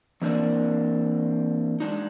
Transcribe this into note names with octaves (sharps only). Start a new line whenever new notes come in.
E3 A#3 C4 D4 A#4 D5
G#3 D4 D#4